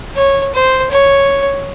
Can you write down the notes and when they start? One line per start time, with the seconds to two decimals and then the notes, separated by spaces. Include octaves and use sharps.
0.16 C#5
0.54 C5
0.91 C#5